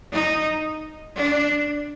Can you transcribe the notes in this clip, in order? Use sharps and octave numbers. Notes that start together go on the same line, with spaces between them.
D#4
D4